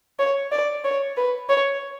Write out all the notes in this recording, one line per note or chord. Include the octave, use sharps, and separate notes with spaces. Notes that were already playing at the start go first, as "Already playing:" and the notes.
C#5
D5
C#5
B4
C#5